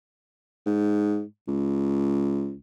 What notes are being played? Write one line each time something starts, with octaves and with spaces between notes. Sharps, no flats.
G#2
C#2